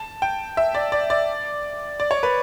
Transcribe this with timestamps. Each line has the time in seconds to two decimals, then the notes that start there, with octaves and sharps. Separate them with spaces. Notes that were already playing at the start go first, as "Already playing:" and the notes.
Already playing: A5
0.22 G5
0.57 E5
0.75 D5
0.92 D5
1.10 D5
2.00 D5
2.11 C#5
2.23 B4